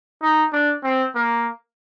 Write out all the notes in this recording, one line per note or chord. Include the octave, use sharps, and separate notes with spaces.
D#4
D4
C4
A#3